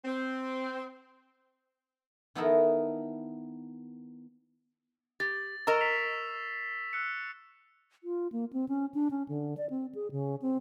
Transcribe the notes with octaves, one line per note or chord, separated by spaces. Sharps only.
C4
D#3 B3 D#4 E4 A4 A#4
G4 A6
A#4 D#5 A#5 C#6 E6 E7
B6 C7 F7
E6 F#6 C#7
F4
A#3
C4
C#4
D4
C#4
D3
D5
C4
G#4
C#3
C4